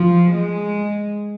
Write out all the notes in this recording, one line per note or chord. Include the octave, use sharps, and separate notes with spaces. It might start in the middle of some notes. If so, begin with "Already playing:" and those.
Already playing: F3
G#3